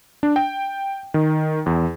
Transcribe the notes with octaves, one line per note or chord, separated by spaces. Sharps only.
D4
G5
D#3
E2